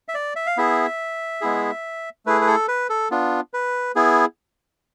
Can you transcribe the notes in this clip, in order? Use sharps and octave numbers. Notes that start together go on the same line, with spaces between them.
E5
D5
E5
F5
B3 E4 G#4 E5
G#3 B3 E4 G#4
A3 E4 G#4 B4
B4
A4
B4
A4
B3 D4 F4
B4
B3 E4 G#4